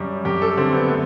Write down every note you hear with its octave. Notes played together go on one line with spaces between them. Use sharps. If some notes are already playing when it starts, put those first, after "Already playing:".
Already playing: F#2 G3 G4
F#2 G4
A4
D3 C4
B3
A3 C4